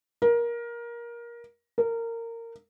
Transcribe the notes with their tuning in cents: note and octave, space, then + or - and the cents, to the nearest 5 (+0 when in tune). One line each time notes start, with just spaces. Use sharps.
A#4 +20
A#4 -20